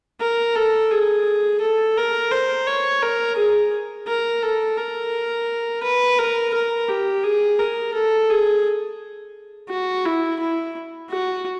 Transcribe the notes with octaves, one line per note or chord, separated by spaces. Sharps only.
A#4
A4
G#4
A4
A#4
C5
C#5
A#4
G#4
A#4
A4
A#4
B4
A#4
A#4
G4
G#4
A#4
A4
G#4
F#4
E4
E4
F#4